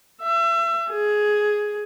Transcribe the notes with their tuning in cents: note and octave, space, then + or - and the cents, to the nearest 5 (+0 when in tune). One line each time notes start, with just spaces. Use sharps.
E5 +35
G#4 +10